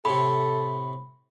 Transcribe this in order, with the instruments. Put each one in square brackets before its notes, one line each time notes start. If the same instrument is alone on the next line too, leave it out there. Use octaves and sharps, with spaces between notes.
[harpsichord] A2 C3 [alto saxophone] A4 [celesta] B5